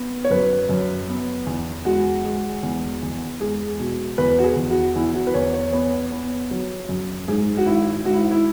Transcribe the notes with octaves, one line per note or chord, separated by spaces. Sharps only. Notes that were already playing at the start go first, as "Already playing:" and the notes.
Already playing: B3
C#5
F#2 B4
F#2
B3
E2
G#3 F#4
G#3
E2
E2
G#3 G#4
B2
E2 B4
F#4
G#4
E2
F#4
E2 E4
F#4
B4
E2 C#5
C#5
B3 C#5
B3
F#3
F#2
G#2 G#4
F#4
G#1 E4
G#2 F#4
E4
E4